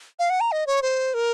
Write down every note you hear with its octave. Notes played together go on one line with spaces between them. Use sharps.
F5
F#5
A#5
D#5
C#5
C5
A#4